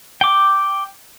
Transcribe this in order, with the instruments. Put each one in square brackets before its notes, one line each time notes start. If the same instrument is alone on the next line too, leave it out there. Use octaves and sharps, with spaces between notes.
[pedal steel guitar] G5 D6